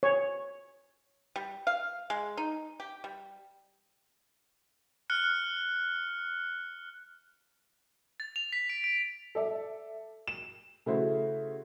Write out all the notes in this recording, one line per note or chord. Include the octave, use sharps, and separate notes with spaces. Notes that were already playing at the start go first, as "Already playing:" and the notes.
C#5
G3
F5
G#3
D#4
G4
G3
F6 F#6 C#7
A6
F7
B6
D7
D7
A4 D5 E5
E7
C#3 A3 E4 F#4 C5